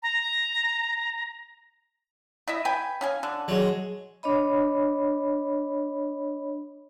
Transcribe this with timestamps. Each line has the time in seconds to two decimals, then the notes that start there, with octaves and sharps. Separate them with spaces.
0.03 A#5
2.48 E4 D#5 E5
2.65 B4 G5 G#5
3.01 C#4 F5 G#5
3.23 D3
3.48 F#3 G#3
4.23 D4 C#5 D#5 B5